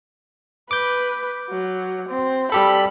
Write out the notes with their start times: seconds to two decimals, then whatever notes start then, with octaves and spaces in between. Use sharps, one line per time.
0.71 B4 D6 G6
1.50 F#3
2.09 C4
2.52 G3 G4 A4 B5